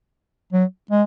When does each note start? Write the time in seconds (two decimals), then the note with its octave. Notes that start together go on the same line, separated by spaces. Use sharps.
0.53 F#3
0.91 G#3